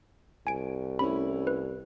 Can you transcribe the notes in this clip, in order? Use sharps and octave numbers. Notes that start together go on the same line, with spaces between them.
C2 G#5 D7
A3 C#4 E4 B5
B4